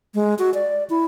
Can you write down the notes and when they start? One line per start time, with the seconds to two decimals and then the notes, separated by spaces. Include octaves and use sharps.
0.15 G#3
0.39 F#4
0.54 D5
0.90 E4